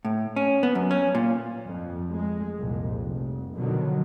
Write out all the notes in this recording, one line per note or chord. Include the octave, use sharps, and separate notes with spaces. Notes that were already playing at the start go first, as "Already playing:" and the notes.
A2
C#4
B3
F#2
C#4
A#2
F2
G#3
C2 F2 A#2
F1
B2 D3 D#3 F3 F#3